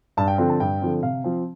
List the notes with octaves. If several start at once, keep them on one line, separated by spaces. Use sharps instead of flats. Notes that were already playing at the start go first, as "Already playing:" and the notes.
G2 A5
G5
D3 F3 C4 G5
A5
G2 G5
D3 F3 C4
C3 F5
F3 C4